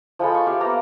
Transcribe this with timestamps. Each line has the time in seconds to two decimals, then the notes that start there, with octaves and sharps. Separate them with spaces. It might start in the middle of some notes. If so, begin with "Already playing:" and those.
0.19 F3 G#3 A4 B5
0.34 C#6
0.47 G4 E5 F5
0.60 A#3 B3 A#5